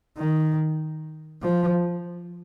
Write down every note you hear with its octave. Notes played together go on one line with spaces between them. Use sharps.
D#3
F3